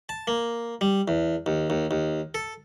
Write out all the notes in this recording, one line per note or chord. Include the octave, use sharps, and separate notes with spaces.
A5
A#3
G3
E2
D#2
D#2
D#2
A4